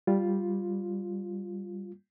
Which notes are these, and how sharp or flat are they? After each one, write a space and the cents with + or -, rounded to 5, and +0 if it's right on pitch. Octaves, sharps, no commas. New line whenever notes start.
G3 +0 F4 +0